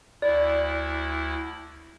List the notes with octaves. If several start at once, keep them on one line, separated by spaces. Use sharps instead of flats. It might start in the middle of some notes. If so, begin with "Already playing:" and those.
D2 E4 D5